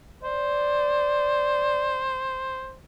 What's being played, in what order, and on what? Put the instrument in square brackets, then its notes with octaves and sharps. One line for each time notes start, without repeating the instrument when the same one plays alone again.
[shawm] C5 [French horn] D5